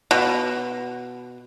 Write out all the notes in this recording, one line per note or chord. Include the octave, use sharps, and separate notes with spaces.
B2